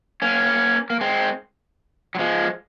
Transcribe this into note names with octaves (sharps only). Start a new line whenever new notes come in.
A#3 C#4
A#3
G#3 C4
F#3
F3 G#3